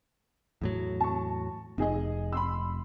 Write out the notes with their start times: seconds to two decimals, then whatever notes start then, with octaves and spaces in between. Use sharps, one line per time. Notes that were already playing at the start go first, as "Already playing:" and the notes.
0.61 E2 A2 F#3
1.00 A5 C#6
1.78 F1 D#4 G#4 D#5
2.32 B5 C6 E6